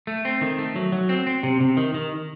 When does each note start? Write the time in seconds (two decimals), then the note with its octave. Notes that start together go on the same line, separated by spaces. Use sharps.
0.07 A3
0.25 C4
0.41 D#3
0.59 A3
0.76 F#3
0.92 F#3
1.09 C4
1.27 C4
1.43 C3
1.61 C3
1.77 D#3
1.94 D#3